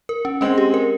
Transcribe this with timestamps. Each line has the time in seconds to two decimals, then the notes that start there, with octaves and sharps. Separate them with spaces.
0.09 A#4
0.25 C#4
0.41 G#3 C4 C#4
0.58 G4
0.74 A#4